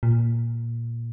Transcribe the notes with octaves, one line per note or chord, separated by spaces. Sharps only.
A#2